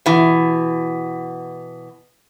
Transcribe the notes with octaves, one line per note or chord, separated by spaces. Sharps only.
B2 E3